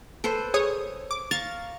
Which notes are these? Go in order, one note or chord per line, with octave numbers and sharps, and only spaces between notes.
A4 B4 C5
G#4 C#5 D#6
D6
F5 A#5 C#6 A6